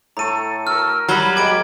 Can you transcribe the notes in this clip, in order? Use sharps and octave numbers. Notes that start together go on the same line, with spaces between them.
A2 A4 A#5 C#6 D#7
F#4 A#4 E6 F6
F#3 G3 A#5 B5 G#6 G7
G#3 A#3 G4 D6 G#6 D7